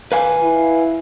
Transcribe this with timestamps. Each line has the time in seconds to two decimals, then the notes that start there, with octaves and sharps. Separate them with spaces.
0.12 B4 F5 G#5
0.42 E4